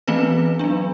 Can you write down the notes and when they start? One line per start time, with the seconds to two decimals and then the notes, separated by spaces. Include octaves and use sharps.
0.08 E3 A3 B3 C4 B4
0.59 F#3 B3 D4